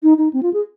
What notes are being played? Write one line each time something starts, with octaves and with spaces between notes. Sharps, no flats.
D#4
D#4
C4
F4
G#4